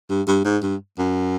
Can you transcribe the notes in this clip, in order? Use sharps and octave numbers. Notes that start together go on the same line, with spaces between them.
G2
G2
G#2
G2
F#2